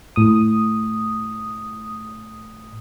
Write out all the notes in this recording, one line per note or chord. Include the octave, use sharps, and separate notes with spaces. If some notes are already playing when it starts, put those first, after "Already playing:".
A2 D#6